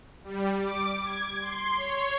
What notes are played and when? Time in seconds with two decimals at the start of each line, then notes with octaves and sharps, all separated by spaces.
0.24 G3
0.61 D6
1.03 G#6
1.41 C6
1.76 C#5